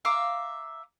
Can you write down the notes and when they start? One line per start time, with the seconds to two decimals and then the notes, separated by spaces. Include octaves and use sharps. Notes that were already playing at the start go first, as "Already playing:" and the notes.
0.05 E5 F5 A#5 D6